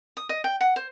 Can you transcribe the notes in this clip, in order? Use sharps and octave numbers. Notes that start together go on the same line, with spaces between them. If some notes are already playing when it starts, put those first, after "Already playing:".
D#6
D#5
G5
F#5
C5